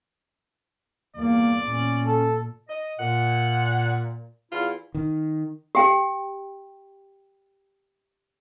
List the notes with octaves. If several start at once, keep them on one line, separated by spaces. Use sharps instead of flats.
E2 G2 A#3 D5
A#2 C#4
A4
D#5
A#2 F#5
E2 E4 F4
D#3
G4 G5